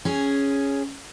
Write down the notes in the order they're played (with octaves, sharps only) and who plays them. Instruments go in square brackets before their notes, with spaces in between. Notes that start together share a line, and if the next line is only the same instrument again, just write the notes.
[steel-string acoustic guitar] C#4 G#4